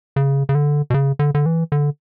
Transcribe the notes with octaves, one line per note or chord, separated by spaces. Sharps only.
C#3
C#3
D3
B2
C#3
D3
D3
E3
D3